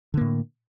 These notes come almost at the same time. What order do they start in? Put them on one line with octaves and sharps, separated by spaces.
D3 A#3 A2